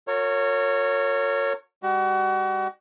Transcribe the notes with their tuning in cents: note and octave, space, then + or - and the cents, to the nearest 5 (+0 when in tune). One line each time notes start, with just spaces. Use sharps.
F#4 -35 A#4 -35 C#5 +0
G3 +35 F#4 +35